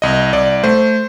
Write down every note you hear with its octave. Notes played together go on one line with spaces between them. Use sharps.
C2 D#5
C2 D5
A3 C5